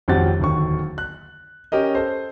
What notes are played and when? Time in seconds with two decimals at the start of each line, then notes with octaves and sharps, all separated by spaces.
0.08 G#1 F2 F#3 G4 F#5 A6
0.40 D1 D#2 D3 C#6
0.98 F#6
1.72 C#4 G4 A#4 D#5
1.95 A4 C5